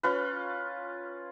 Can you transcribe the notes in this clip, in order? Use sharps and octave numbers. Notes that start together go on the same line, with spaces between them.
C#4 F4 B4